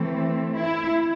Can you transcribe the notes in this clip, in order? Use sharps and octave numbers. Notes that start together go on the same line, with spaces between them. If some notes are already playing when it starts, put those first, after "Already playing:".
Already playing: E3 A3 C4
E4